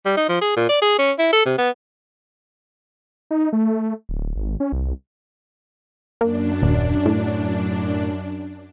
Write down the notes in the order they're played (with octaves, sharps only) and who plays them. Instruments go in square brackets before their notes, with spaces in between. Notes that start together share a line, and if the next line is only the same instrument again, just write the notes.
[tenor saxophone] G3
D#4
F3
G#4
A#2
D5
G#4
C#4
E4
A4
C3
B3
[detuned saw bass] D#4
A3
D1
G#1
C#4
C2
[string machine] F#2 D4 [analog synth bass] A#3
[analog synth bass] D#1
A2